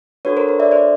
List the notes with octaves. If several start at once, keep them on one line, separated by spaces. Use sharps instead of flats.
D4 F#4 A4 B4 C#5
A#4 C5
B4 C#5
D5 E5
C5 D5